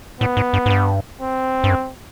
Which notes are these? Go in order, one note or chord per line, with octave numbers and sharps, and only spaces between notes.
A2 B3
G#2
G2
G#2
G2
C4
G2
F#2